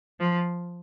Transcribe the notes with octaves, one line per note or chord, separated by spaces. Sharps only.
F3